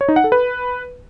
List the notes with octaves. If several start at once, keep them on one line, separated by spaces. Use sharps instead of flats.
C#5
D#4
F#5
A4
B4